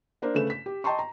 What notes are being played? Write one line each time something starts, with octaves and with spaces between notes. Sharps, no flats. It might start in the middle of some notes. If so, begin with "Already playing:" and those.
A#3 D4 A#4 C5
C#3 A3 B4 E7
B6
G4
D#5 G5 A5 A#5 C6 C#6
A#5